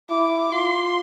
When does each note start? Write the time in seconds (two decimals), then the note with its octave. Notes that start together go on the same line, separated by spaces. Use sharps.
0.10 E4 D6
0.52 F4 C6